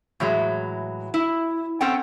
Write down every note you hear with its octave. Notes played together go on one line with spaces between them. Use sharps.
A2 E3 F#3 G#3
E4
C4 C#4 A4 F#5 G5